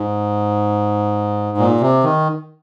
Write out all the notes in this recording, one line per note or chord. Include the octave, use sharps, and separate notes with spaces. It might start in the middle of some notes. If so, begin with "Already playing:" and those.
Already playing: G#2
A#2
C3
D#3